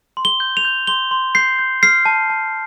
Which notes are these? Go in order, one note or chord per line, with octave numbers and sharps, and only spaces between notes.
C6
G7
G6
F7
G6
C6 G7
C6
G6 C7
G6
F6 C7
A5
A5